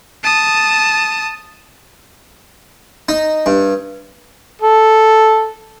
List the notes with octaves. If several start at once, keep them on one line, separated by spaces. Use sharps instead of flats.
A5 D#6
D#4
G2
A4